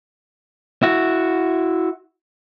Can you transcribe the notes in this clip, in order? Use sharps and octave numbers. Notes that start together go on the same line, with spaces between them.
E4 F#4